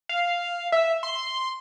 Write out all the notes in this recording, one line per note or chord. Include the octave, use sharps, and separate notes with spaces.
F5
E5
C6